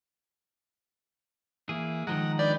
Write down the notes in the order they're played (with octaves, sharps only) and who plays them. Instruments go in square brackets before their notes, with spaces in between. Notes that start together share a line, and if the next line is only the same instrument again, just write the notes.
[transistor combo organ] E3 [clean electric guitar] A#3 G#4
[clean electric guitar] D#3 F3 G#3 [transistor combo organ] F#5 A#5
[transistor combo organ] D4 B4 G5 [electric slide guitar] D5